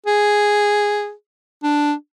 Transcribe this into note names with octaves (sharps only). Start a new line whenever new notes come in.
G#4
D4